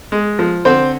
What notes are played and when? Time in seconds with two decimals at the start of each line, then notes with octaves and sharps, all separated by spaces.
0.12 G#3
0.39 F3
0.65 D3 C4 C5